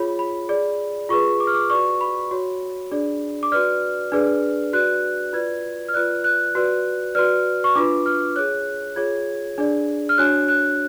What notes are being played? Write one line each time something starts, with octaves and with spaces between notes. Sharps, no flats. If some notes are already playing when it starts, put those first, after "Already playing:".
Already playing: F4 G#4 C#5 B5
B5
G#4 D5
F4 G#4 B4 C#6
D6
F6
D6
F#4 B4 D5 C#6
B5
F#4 C#5
D4 G#4 D5
D6
F#4 B4 D5 F6
D4 G#4 B4 D5
F#4 B4 D5 F#6
F4 B4 D5 G#6
F6
F4 B4 D5 F#6
F#6
F#4 B4 D5
F#4 B4 D5 F6
C#6
D4 F4 B4 D6
F6
G#4 C#5 F#6
F4 G#4 C#5 G#6
D4 G#4 D5
F6
D4 F#4 C#5 F#6
F#6